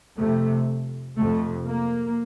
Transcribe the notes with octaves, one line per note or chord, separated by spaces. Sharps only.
F2 C3 A3
F2 C3 A3
A#3